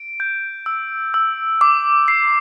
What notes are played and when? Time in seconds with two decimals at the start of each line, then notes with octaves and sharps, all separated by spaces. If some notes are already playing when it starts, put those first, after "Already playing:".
Already playing: D7
0.20 G6
0.66 E6
1.14 E6
1.61 D6
2.08 C7